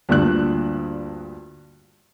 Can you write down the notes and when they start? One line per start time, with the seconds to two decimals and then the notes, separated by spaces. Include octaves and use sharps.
0.09 D2 G2 A#2 D4 F#6